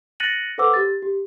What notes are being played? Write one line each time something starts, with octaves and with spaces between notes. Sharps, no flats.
F#6 A6 A#6 C#7 D#7 F#7
A4 B4 C5 F#5 D6 E6
G4 A6
G4